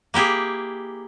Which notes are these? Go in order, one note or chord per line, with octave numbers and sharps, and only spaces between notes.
A#3 E4 G4 G#4